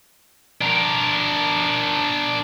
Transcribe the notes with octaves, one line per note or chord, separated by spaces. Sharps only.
D4 A#4